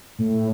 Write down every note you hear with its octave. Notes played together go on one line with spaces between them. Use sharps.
A2